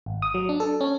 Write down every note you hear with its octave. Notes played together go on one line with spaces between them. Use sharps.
G#1
D#6
F#3
D4
A4
C#4